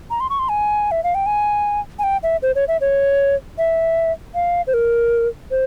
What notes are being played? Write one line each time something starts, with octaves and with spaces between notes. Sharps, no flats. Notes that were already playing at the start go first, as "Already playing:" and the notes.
A#5
C6
C#6
C6
G#5
E5
F5
G5
G#5
G#5
G5
E5
C5
C#5
E5
C#5
E5
F5
C5
A#4
C5